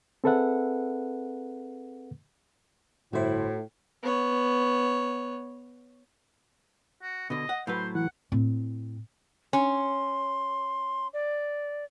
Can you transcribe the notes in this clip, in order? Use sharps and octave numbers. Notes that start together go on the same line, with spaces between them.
C4 G#4 A4 B4 E5 F#5
G1 A2 A3 E4 F#4 C5
B3 C#5
F#4
B2 D3 D#5
F#5
A2 F#3 B4 C5
E3 F#5
A2 C4
C#4 C6
D5